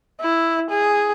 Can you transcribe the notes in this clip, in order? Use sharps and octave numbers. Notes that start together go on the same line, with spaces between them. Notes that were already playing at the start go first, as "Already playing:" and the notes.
E4
G#4